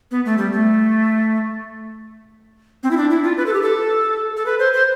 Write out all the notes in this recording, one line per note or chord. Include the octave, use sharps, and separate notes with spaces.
B3
A3
G3
A3
C4
E4
D4
E4
F4
B4
A4
G4
A4
A4
B4
C5
C5